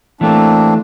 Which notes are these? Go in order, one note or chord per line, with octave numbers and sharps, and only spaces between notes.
E3 A3 A#3 C4 D4